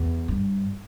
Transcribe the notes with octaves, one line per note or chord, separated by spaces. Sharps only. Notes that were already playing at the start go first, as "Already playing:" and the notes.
Already playing: E2
G2